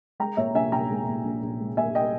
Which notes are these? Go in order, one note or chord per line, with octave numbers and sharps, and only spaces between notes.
G#3 G5 A#5
A#2 C#5 E5
A#1 E5 G#5
A#1 G5 A#5
G#3
A#2
A#1
A#1
G#3
A#2 E5 G#5
D#5 G5